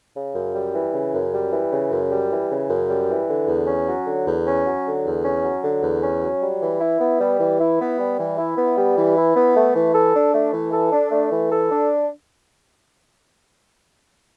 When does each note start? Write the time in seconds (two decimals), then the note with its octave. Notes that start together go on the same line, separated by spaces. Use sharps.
0.15 C#3
0.34 F#2
0.54 G3
0.74 E3
0.93 C#3
1.13 F#2
1.33 G3
1.52 E3
1.72 C#3
1.91 F#2
2.11 G3
2.31 E3
2.50 C#3
2.70 F#2
2.89 G3
3.09 E3
3.28 D3
3.48 E2
3.67 C#4
3.87 F#3
4.06 D3
4.26 E2
4.46 C#4
4.65 F#3
4.85 D3
5.05 E2
5.24 C#4
5.44 F#3
5.63 D3
5.83 E2
6.03 C#4
6.22 F#3
6.42 G3
6.62 E3
6.80 E4
7.00 B3
7.20 G3
7.39 E3
7.60 E4
7.80 B3
7.99 G3
8.19 E3
8.38 E4
8.57 B3
8.77 G3
8.97 E3
9.17 E4
9.36 B3
9.56 A3
9.75 E3
9.94 A4
10.15 D4
10.34 A3
10.53 E3
10.72 A4
10.92 D4
11.11 A3
11.31 E3
11.51 A4
11.71 D4